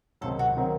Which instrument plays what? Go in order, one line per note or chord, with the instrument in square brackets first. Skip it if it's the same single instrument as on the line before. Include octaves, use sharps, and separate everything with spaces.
[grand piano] C#2 C3 D#3 F#3 [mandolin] A4
[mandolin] F#4
[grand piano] C3 D#3 F#3